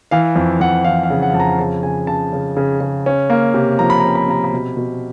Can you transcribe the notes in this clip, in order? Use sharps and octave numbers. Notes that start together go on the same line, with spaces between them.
E3 F5
F2
F2 F#5
E3 F5
F5
C#3
F#5
F2 A5
A#5
C#3 A5
C#3 G#5
C#3 A5
C#3
C#3
C#3
C#4
A#3
C3
F3 A#5
B5
A#5
C#4
B5
C3 A#5
B5
B2
B2